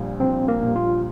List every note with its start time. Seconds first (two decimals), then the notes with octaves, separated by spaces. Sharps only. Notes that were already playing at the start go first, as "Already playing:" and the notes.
Already playing: A#1 A#2 G3
0.20 A#1 C4
0.48 A#3
0.62 A#2 G3
0.76 F4